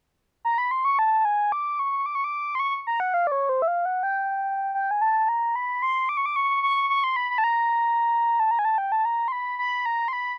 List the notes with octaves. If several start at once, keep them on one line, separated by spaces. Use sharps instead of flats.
A#5
B5
C6
C#6
A5
G#5
D6
C#6
D6
C#6
D6
C6
C#6
A#5
F#5
F5
D5
C#5
C5
E5
F5
F#5
G5
G5
G#5
A5
A#5
B5
C6
D6
C#6
D6
C#6
C#6
C#6
C6
B5
B5
A5
A#5
A5
A#5
G#5
A5
G5
A5
A#5
C6
B5
B5
A#5
C6
B5